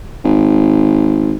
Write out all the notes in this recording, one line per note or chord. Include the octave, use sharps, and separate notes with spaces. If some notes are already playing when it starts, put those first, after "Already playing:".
G#1